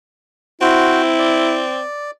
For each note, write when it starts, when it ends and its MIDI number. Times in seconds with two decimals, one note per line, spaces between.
0.61 1.82 60
0.61 1.64 64
0.61 1.02 66
0.61 1.02 72
1.19 2.11 74